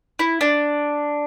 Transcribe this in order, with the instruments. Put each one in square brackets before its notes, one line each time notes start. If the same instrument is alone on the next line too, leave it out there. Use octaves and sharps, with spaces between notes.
[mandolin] E4
D4